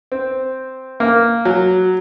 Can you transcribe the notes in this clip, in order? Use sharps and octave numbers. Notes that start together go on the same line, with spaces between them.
C4
A#3
F#3